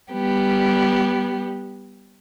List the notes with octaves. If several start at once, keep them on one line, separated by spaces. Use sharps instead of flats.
G3 B3 G4